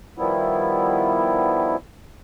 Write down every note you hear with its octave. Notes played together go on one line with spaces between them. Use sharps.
D#3 F3 G3 B3 E4